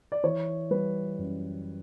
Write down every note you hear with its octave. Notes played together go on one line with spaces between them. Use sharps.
D5
E3 C#5
G3 B4
F#2